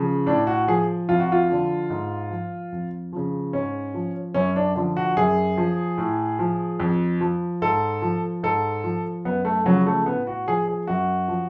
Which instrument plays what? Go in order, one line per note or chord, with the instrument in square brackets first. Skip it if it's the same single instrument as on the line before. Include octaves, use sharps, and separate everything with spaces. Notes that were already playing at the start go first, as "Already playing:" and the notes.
Already playing: [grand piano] C#3 F3
A2 D4
F#4
F3 G#4
F2 F4
F#4
F4
D3 F3
G#2
F3
F2
C#3 F3
G#2 C#4
F3
F#2 C#4
D4
D3 F3
F#4
F#2 G#4
F3
A2
F3
F2
F3
G#2 A4
F3
G#2 A4
F3
F#2 B3
A3
C#3 F3 F#3
A3
A2 B3
F#4
F3 G#4
G#4
F#2 F#4
F3